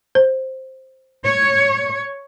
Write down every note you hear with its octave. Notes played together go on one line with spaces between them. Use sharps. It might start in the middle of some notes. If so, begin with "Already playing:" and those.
C5
C#5